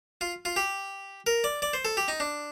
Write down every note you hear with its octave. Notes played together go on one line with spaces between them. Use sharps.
F4
F4
G4
A#4
D5
D5
C5
A4
G4
D#4
D4